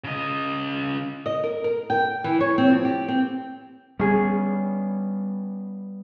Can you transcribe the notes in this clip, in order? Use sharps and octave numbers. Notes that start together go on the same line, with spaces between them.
C#3 D#5
D#5
A#4
A#4
G5
E3
C#5
C4
F3
G4
C4
G3 A3 B3 C#4 G#4